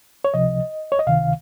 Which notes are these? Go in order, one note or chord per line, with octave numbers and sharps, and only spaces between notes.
C#5
C#2 C3 F3 D#5
C#5
D#5
C#2 C3 D#3 F5